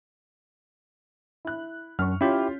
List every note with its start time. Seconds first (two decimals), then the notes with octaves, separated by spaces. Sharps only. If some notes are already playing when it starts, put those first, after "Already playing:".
1.45 E4 F#6
1.99 F#2 C#6 F6
2.21 C#4 E4 F4 G4 G6 B6